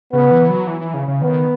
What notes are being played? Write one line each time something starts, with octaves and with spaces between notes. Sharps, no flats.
C#3 B3
E3
F#3
E3
E3
C#3
C#3
D#3 B3